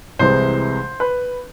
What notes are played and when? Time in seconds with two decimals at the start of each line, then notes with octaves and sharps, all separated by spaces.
0.19 C2 C3 E3 G#3 C5
1.00 B4